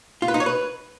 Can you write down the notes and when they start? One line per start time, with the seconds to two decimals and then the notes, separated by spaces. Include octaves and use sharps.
0.22 F4
0.28 B4
0.34 D#4
0.40 C#5
0.46 B4